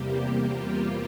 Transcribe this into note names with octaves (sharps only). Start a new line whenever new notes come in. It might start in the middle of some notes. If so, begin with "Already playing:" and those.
Already playing: E2 C3 G3 A#3 G4
F4